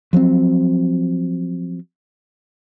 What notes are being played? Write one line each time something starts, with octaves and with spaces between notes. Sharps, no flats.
F3 F#3 A#3 C4